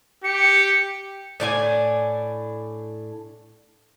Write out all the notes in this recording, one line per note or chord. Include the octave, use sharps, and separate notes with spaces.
G4 C#7
A2 D4 F4 G#5